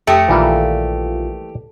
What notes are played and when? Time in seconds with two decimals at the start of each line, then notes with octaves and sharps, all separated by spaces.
0.07 F2 A3 G4 A#4 A5 D#6 C#7
0.28 A#1 D#3 E3 G3 A#3 F4